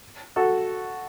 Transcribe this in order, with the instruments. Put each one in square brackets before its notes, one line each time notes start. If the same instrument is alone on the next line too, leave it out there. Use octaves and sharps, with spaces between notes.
[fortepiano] F#4 A4